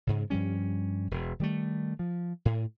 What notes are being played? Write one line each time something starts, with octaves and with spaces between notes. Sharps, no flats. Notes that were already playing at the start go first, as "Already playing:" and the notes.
G#2 C#3
G2 F3 G3 C#4
E1
D#3 G3 A3
F3
A2